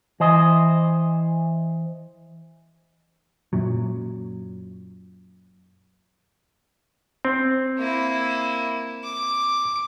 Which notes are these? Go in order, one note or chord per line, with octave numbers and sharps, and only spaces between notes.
E3 C5 D#5
F#2 A#2 F#3
C4
A#3 E4
D6